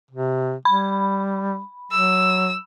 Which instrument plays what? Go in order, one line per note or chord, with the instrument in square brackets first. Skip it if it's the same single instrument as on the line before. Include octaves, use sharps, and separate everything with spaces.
[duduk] C3
[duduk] G3 [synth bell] B5
[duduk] F#3 [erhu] E6